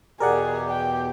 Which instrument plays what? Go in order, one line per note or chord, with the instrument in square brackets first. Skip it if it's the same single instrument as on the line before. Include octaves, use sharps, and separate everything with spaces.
[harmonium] E2 B2 G4 [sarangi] G#4 [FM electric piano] A#4 D5 F#5
[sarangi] G5